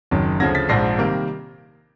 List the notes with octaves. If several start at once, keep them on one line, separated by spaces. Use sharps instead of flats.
F#1 F#2 D#3
D2 C#3 F3 G#6 A#6
A6 B6
A#1 G#2 F3 A#6 C7
C3 D#3 G3 A#3